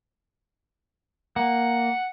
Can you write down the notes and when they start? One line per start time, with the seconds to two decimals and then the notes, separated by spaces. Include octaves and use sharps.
1.36 A#3 F#5